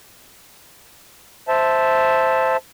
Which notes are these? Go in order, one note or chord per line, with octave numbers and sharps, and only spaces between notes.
C5 E5 A5